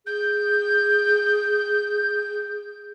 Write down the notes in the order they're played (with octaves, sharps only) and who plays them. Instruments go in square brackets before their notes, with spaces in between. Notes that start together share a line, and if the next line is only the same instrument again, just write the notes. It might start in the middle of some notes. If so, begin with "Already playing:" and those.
[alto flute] G#4 [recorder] G6